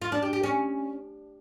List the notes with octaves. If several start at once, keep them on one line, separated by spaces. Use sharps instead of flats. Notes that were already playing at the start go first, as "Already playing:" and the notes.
F4
D4
G4
G4
C#4